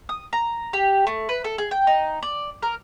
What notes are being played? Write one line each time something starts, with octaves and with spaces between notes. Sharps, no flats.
D#6
A#5
G4
A3
B4
A4
G#4
G5
D#4
D5
A#4